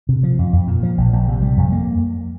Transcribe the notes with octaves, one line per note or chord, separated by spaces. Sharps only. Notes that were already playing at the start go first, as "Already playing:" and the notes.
C3
F3
F2
F2
A#2
F3
A#1
A#1
C3
G3
F2
A#3